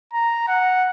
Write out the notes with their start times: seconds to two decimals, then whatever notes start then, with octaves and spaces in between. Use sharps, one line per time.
0.14 A#5
0.48 F#5